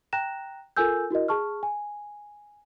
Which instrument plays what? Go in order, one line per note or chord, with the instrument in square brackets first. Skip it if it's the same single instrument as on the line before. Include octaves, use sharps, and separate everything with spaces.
[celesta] G5 A#5 F#6 A#6 E7
F4 A4 A#4 G#5 E6 G6
E4 F#4 A#4 D#5
G#4 A5 C#6 F6
G#5